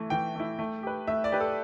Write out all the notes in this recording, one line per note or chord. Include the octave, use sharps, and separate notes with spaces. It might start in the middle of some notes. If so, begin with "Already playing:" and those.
Already playing: E3 A3 E4
E3 G5
A3 E4
A3
G4 B4
A3 E5
D5
G4 B4
A4